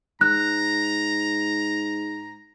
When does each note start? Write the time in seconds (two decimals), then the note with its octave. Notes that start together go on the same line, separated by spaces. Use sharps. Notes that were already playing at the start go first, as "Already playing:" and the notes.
0.21 G#2 A#5 F#6